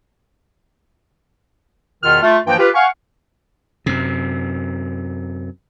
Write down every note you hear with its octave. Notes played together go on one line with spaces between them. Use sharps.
E2 B2 D#3 F4 F6
A3 F4
G2 E3 F3 A#3 F4 G5
F4 G4 B4
F5 F#5 G#5 C#6
F#2 C3